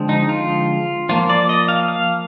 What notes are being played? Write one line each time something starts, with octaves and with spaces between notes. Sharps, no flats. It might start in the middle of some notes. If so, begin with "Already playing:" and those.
Already playing: D3 F3 G#3 C4
D#4
F4
F3 A#3 F4
D5
D#5
F5
F5